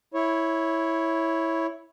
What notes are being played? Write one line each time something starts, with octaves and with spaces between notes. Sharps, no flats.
E4 C#5